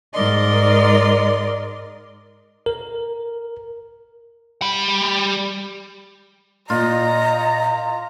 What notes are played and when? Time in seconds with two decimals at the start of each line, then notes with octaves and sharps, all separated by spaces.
0.14 G#2 A#4 D5 D#5 C6
2.66 A#4
4.62 G3 B5
6.70 A#2 F4 D#5 A#5